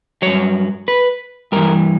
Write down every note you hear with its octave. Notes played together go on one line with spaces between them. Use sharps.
G2 F#3 C#5
B4
G2 E3 A#4